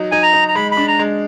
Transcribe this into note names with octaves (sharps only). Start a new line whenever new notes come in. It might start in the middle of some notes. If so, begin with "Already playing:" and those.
Already playing: F#3 D#4
D#4 G#5
A#5
D#4
A#5
G#3 B5
B5
D4
A#5
G#3